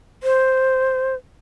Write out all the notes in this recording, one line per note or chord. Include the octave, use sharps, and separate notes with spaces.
C5